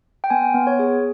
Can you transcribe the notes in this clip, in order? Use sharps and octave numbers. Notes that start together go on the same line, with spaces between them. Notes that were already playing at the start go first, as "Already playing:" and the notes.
G5
B3 G#5
B3
C#5
G#4